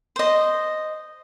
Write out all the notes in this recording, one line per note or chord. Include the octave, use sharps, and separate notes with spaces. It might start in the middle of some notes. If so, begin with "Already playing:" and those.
C5 D#5